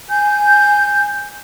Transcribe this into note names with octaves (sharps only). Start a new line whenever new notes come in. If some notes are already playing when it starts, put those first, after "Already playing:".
G#5 G6